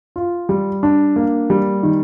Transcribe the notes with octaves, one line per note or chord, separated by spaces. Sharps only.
F4
G3
D4
A#3
G3
D#3